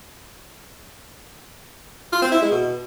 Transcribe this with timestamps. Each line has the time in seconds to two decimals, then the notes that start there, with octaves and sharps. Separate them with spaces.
2.12 F4
2.22 C4
2.32 E4
2.42 G#3
2.51 B2